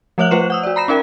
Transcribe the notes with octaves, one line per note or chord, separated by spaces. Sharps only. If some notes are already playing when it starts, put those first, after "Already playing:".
F3 A3 C#5 E5 F#6 F#7
A3 F4 B4 C5 E7
F#5 D#6 E6
F#4 D5
A#5 B5 A#6 E7
C#4 D#4 A#4 G5